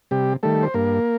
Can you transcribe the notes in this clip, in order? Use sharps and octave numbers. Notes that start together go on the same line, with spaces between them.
C3 G3 G4
D#3 G3 A3 A4
C5
G2 A#3 A#4